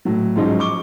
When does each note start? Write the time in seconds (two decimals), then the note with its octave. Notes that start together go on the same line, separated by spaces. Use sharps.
0.05 A2 F#3
0.36 G#2 F3 F#3 G#3 C#4 D#4
0.59 C#6 D6 G7